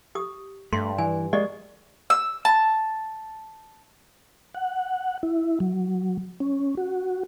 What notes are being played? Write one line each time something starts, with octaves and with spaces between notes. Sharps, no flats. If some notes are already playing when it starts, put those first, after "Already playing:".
G4 D#6
G2 A3 C6
E3 G#5
G#3 A#3 G4 D5 D#5
E6
A5
F#5
E4
F#3
C#4
F#4